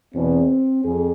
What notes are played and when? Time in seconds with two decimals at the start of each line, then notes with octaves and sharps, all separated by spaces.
0.13 E2 B2 C4
0.83 F2 G#4